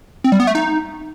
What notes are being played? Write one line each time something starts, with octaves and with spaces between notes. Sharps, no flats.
C4
G3
B3
A3
D#4